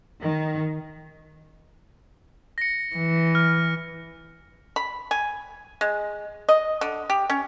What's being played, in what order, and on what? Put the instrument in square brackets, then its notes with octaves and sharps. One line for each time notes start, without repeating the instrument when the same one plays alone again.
[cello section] D#3
[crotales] A#6 C#7
[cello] E3
[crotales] F6
[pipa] B5
G#5
G#3
D#5
D3
G4
C#4